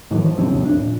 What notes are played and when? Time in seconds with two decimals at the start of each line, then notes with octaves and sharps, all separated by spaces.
0.11 G#2 D#3 E3 F#3
0.25 F3
0.37 B1 G2 C4 C#4
0.49 C#2 B2 F3
0.62 F2 D4
0.78 A#2